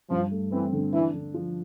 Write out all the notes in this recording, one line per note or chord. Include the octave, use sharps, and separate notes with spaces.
G2 F3
A3
E3 C4
D3
E3 D4
D3
F3